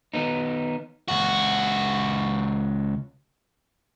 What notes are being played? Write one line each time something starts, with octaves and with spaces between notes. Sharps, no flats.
D#3 B3 D#4
C#2 F#4